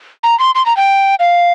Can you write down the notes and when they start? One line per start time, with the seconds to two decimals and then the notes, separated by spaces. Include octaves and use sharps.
0.23 A#5
0.39 C6
0.55 C6
0.66 A#5
0.77 G5
1.20 F5